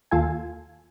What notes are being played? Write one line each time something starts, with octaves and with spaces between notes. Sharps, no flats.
D#2 F4 A4 G#5